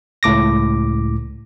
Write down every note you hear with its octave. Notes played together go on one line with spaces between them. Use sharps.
C#2 A2 D6 A#6